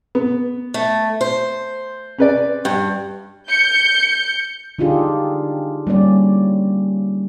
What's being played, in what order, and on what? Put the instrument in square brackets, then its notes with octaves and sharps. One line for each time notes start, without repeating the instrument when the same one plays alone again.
[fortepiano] B3
[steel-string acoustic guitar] A3
C5
[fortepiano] C#4 B4 D5
[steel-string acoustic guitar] G2
[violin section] G6 C#7
[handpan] D3 D4 D#4 F4 G4 G#4
G3 A#3 C#4 D5